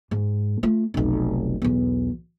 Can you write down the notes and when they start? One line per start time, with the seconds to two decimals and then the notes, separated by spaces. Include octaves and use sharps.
0.11 G#2
0.63 A3 F4
0.94 F1 B1
1.62 B1 E2